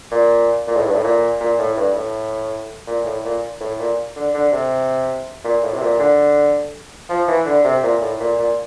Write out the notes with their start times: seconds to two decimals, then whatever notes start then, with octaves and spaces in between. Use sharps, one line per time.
0.12 A#2
0.67 A#2
0.76 A2
0.86 G2
0.94 A2
1.04 A#2
1.41 A#2
1.59 A2
1.77 G2
1.95 A2
2.87 A#2
3.05 A2
3.24 A#2
3.60 A2
3.79 A#2
4.16 D3
4.34 D3
4.52 C3
5.44 A#2
5.63 A2
5.74 C3
5.82 A#2
5.99 D3
7.09 F3
7.28 E3
7.46 D3
7.64 C3
7.83 A#2
8.01 A2
8.20 A#2
8.39 A#2